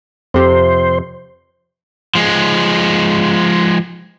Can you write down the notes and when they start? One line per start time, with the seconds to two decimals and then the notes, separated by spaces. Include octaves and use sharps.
0.34 F2 C3 C5
2.15 F3 G#3